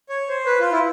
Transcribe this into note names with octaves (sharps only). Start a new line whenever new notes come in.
C#5
C5
B4
F4
E4